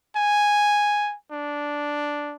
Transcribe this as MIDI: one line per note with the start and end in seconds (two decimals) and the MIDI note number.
0.17 1.15 80
1.32 2.36 62